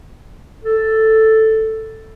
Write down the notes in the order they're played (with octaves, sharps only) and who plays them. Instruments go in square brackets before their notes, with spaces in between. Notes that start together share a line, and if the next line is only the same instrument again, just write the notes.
[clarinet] A4